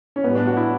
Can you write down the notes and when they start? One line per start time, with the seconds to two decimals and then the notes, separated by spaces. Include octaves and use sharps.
0.16 C#4
0.24 A2 G3 B3
0.35 D4
0.47 F#4
0.57 E4